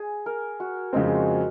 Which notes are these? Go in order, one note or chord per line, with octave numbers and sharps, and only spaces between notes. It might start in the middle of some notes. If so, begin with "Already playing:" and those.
Already playing: G#4
A#4
F#4
F2 C#3 G#3 C4 D#4
G#4
F#4